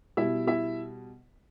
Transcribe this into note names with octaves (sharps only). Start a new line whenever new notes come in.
B2 G3 E4 E5
E4 E5